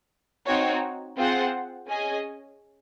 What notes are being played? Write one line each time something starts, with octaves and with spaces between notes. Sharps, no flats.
C4 D#4 F#4 C#5
C4 F4 G#4 C5 F#5
C#4 G#4 D#5 G#5